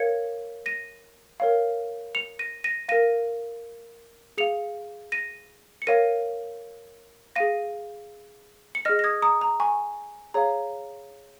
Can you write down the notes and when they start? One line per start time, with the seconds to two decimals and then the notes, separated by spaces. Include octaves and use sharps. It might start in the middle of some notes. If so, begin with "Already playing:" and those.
Already playing: A#4 C#5 F5 G#6 C#7
0.66 A#6 D#7
1.40 A#4 C#5 F5
2.15 C#7 F7
2.39 A#6 D#7
2.64 A#6 D#7
2.88 A#4 F5 A#6 D#7
4.38 G#4 F5 C#7 F7
5.12 A#6 D#7
5.82 C#7
5.87 A#4 C#5 F5 A#6 D#7
7.36 G#4 F5 A#6 D#7
8.75 C#7
8.85 G#4 D#5 F6 A#6
8.99 A#6
9.04 D#6 G#6
9.22 A#5 D#6
9.41 A#5
9.60 G#5 C#6
10.34 G#4 C#5 F5 A#5